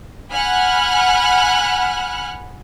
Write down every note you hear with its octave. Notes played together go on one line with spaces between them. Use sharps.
F#5 G#5 B5 F6 F#6